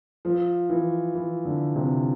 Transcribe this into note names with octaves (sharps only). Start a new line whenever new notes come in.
F3
E3
E3
D3
C3